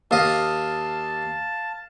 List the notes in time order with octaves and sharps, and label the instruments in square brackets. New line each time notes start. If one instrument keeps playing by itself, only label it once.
[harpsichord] D#2 D#5 [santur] F5 [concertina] A5